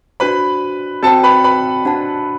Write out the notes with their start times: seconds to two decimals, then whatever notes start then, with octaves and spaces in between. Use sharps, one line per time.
0.20 D4 F#4 B4 C5 B5
1.03 C4 F#4 A4 C5 G5 A5
1.23 B4 B5
1.44 B4 B5
1.85 D4 F#4 C5 F#5 A5